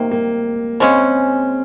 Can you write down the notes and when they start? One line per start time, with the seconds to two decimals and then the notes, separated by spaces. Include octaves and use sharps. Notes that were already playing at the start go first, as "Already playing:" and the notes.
Already playing: C3 D#3 A#3
0.11 A#3
0.80 C#3 G#3 C4 C#4